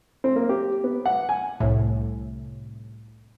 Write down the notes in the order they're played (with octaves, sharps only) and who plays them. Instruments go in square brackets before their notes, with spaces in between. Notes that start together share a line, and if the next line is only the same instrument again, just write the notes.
[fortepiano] C4
A#3
G4
B3
F#5
G#5
[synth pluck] C2 A2